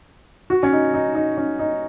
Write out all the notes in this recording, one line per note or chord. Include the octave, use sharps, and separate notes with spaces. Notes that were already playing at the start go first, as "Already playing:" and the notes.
F#4
C#4
D#4
D#4
D#4
C#4
D#4